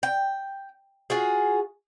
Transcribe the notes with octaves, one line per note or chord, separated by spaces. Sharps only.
G5
F4 F#4 G#4